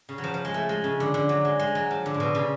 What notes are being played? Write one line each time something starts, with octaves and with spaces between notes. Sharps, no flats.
C#3
F#3
F3
F3
G#3
A3
G#3
C#3
D3
D3
F#3
G#3
G#3
F#3
F3
D3
A2
B2
C#3